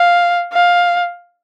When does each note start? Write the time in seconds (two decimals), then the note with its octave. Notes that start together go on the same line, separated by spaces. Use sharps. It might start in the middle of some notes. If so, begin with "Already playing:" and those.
Already playing: F5
0.53 F5